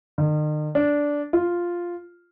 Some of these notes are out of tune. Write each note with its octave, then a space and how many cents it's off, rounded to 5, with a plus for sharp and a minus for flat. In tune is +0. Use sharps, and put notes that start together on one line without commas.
D#3 -40
D4 -10
F4 +0